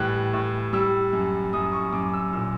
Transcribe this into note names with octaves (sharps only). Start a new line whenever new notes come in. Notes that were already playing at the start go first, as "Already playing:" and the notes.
Already playing: A2 E3 G3 F#6
A2
G3 E6
F#2
F#2 D#6
C#6
F#2 D6
E6
A#2 E6